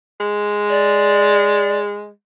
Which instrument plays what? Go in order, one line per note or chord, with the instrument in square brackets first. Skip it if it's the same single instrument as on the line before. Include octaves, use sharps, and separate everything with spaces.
[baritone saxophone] G#3
[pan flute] D5